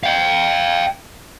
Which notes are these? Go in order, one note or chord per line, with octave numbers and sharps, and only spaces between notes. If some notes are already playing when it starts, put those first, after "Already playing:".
F5 G5